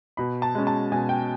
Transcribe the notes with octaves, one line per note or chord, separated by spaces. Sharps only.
B2 B5
A5
G#3 C#4
A5
B2 G#5
G5